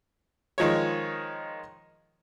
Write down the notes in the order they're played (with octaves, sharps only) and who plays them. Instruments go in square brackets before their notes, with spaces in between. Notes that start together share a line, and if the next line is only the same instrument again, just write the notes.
[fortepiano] D#3 F3 G#3 C#5